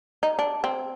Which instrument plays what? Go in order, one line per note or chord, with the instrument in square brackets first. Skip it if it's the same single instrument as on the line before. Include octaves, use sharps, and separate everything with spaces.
[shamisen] D#4
D4
C4